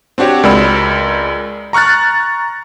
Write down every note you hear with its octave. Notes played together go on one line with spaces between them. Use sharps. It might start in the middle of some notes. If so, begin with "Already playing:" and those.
C4 D4 F#4 G4 C#5
C#2 G#3 A#4 D5 B5 E6
A#5 C#6 F6 F#6 A6